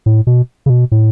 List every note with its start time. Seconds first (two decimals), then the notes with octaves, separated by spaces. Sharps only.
0.06 A2
0.27 B2
0.66 C#3
0.70 B2
0.92 A2